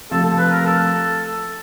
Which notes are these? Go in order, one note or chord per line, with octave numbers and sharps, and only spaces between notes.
C3 F3 A3 A4
A4
B4
A#4
A4